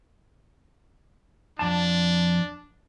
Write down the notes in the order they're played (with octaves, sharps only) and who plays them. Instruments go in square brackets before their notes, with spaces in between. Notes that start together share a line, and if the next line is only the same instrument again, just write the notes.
[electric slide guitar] F2 A5 [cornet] D4